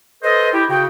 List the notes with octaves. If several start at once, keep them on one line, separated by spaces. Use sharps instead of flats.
A4 B4 C5 D#5
E4 G4
C#3 F#4 G5